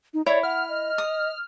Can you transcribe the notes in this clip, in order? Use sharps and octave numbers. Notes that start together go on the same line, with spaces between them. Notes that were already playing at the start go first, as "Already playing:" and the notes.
D#4
E4 C#5 D5
F#5 F6
D#5
D#6